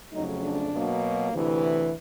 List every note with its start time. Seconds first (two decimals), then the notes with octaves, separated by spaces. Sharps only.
0.12 F2 C#3 F#3 A3 D#4
0.42 D4
0.72 B2 F#3 A#3
1.33 D2 C3 E3